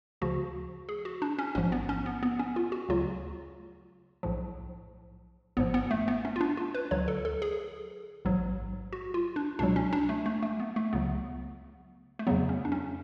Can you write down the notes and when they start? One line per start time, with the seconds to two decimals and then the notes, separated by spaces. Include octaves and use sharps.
0.21 D2 C#3 F3 F#4
0.89 G#4
1.05 F#4
1.22 D4
1.39 C#4
1.55 A1 G#2 F3 C#4
1.72 B3
1.89 C#4
2.06 B3
2.23 B3
2.39 C#4
2.56 F4
2.72 F#4
2.89 D2 C#3 F#3 F4
4.23 B1 A2 F3
5.57 G#1 G#2 F3 B3
5.74 B3
5.91 A3
6.08 B3
6.25 C#4
6.36 F4
6.41 D4
6.57 F4
6.75 B4
6.91 D2 D3 F#3 C#5
7.08 A4
7.25 A4
7.42 G#4
8.25 A1 G#2 F#3
8.93 F#4
9.14 F4
9.36 D4
9.59 C#2 B2 F#3 D4
9.76 C#4
9.93 D4
10.09 A3
10.26 A3
10.43 A3
10.60 B3
10.76 A3
10.93 C#2 C#3 F#3 B3
12.19 A3
12.27 F2 C#3 F#3 B3
12.49 C#4
12.65 D4
12.72 C#4